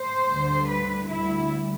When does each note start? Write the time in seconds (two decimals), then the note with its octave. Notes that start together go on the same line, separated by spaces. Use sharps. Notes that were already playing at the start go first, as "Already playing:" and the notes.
Already playing: C5
0.29 D2 D3 G3
0.68 B4
1.08 D2 D3 G3 E4